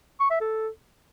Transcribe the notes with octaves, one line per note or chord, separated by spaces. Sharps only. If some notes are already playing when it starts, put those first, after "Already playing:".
C#6
E5
A4